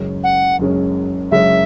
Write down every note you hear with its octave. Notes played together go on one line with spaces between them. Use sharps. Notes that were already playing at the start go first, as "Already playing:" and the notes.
Already playing: F#1 F#2 C#3 G#3 C#4
F#5
F#1 F#2 C#3 G#3 C#4
F#1 F#2 C#3 G#3 C#4 E5